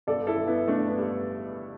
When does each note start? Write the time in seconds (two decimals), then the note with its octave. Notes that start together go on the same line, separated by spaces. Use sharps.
0.07 G1 A4 D5
0.27 E4 A4
0.38 G1
0.47 B3 E4
0.68 G1 A3 D4
0.88 B3
0.98 G2